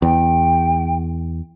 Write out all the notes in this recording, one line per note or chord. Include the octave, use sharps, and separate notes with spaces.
E2 G5